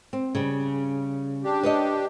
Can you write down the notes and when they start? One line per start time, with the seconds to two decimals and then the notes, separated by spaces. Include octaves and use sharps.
0.13 C4
0.35 C#3 G3
1.44 D4 G4
1.63 B4 C#5 D#5